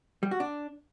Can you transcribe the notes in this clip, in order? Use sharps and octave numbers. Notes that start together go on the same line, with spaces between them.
G3
F#4
D4